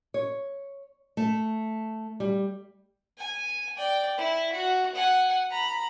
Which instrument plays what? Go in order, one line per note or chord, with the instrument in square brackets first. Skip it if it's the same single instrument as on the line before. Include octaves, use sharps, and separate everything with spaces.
[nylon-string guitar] C#5
A3
G3
[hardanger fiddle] G#5
D5 G5
E4
F#4
F#5 G#5
A#5 B5